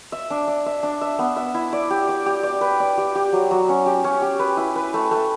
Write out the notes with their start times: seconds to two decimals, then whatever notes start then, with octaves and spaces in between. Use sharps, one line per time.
0.12 E5
0.30 D4
0.48 D4
0.66 E5
0.83 D4
1.01 E5
1.19 B3
1.37 E5
1.54 E4
1.73 D5
1.90 G4
2.09 D5
2.26 G4
2.43 D5
2.61 B4
2.80 D5
2.98 G4
3.15 G4
3.33 F#3
3.51 F#3
3.69 C#4
3.86 G4
4.04 C#4
4.22 G4
4.39 B4
4.57 E4
4.76 B4
4.94 A3
5.11 A3